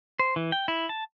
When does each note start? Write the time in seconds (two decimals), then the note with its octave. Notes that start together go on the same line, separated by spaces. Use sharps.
0.19 C5
0.36 E3
0.52 G5
0.68 E4
0.89 A5